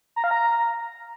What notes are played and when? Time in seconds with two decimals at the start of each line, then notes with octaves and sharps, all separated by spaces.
0.16 A#5
0.24 F5
0.31 A#5